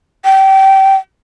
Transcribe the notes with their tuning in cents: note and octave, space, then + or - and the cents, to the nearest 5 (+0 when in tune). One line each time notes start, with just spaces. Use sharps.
G5 -25